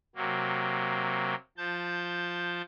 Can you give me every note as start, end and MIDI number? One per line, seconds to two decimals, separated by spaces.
0.16 1.35 48
0.16 1.35 54
0.16 1.35 58
1.58 2.62 53
1.58 2.62 81
1.58 2.62 91